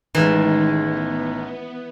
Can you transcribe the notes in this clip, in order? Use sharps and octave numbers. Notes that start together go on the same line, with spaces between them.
A1 D#3 E3 G#3 D#4
B3